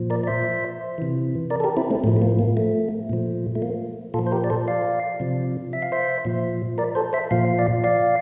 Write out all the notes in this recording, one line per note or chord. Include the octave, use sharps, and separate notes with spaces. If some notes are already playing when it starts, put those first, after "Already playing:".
Already playing: A#2 F3
A#4 D5
D5
C5 E5
C3 E3
A#4 D5
A4
G4 A#4
C4 E4
A3 C4
A2 F3 A3
A3
A#3
A#3
A3
A#2 F3
A3
A#3
A#2 F3 F4 A4
C5
G4 A#4
D5
A4 C5
D5 F5
C3 F3
E5
F5
C5 E5
A#2 F3
A#4 D5
A4 C5
C5 E5
A#2 F3 F5
D5 F5
D5 F5